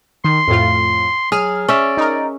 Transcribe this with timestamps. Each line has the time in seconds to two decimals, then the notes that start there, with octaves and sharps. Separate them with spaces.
0.24 D#3 C6
0.48 F2 A2 F4
1.32 F#3 G#4 F6
1.69 C#4 D5 E5
1.97 D#4 A#4